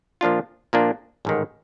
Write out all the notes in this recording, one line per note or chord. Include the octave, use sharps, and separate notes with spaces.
A#2 F3 A#3 D4 F4
A#2 F3 A#3 D4 F4
A1 G#2 D#3